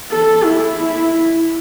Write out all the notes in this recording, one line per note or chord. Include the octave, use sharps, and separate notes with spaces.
A4
E4